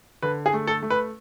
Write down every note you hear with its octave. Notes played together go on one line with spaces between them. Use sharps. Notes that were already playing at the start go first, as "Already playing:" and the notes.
D3 B4
G#4
A3
A4
A3
B4